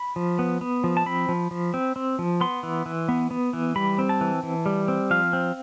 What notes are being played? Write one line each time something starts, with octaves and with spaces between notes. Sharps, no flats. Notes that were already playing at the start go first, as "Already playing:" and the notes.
Already playing: B5
F3
B3
B3
F3
A5
C4 B5
F3
F3
C4
C4
F3
B3 C6
E3
E3
B3
B3
E3
G3 B5
C4
A5
E3
E3
G3
C4
F3 F5
C4